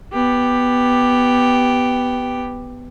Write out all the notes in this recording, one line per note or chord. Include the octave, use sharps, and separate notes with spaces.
B3 G4